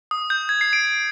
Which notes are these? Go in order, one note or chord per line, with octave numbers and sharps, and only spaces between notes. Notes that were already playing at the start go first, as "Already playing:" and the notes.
D#6
G6
G#6
C7
D7
D7